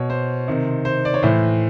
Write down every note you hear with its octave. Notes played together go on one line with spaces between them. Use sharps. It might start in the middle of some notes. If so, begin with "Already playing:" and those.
Already playing: B2 C#5
C5
C3 D#3
C5
D5
C#5
A2 E3 C5